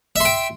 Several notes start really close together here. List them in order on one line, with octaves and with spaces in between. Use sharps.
E5 C6 G5